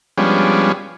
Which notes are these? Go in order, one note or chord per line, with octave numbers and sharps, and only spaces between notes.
F3 G3 G#3 B3 C#4 D4